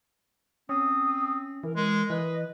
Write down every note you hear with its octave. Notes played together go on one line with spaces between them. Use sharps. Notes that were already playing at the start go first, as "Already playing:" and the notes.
C4 C#4 D#6
E3 A#4
G#3 A#4
E3 B4 D#5